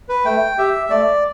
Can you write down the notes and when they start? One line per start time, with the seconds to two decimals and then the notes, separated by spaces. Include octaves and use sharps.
0.09 B4
0.25 A3 G5
0.58 G4 E5
0.90 A3 D5